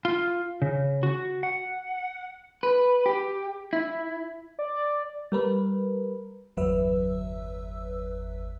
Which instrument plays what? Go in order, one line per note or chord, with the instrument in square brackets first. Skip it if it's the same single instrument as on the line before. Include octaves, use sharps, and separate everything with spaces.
[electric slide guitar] F4
C#3
F#4
F#5
B4
G4
E4
[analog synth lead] D5
[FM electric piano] G3 A#4 B4
G1 E2 F#3 B4 E5 E6